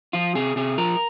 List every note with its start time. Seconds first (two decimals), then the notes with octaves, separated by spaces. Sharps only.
0.13 F3 F4
0.35 C3 G#4
0.56 C3 G#4
0.78 F3 A#4